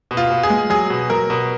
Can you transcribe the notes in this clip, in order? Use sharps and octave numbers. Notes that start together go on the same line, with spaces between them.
B2
F4
B2
G#4
G#3
F#3 G#4
B2
F#3 A#4
B2